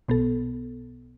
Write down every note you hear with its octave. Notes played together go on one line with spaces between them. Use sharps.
B1 B2 B3 A4